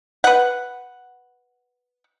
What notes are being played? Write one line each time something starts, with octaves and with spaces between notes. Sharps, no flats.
B4 F#5